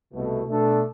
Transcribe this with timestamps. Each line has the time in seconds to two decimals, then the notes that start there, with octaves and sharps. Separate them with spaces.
0.13 C2 B2 A3
0.47 B2 A3 D4 A4